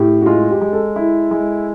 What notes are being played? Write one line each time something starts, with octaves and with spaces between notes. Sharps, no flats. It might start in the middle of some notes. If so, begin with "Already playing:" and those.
Already playing: A2 G4
F#4
G#3 F4
G4
G#3
A4
E4
G#3